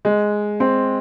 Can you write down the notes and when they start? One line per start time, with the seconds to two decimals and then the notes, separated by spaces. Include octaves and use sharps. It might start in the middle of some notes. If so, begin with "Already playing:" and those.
0.05 G#3
0.60 C4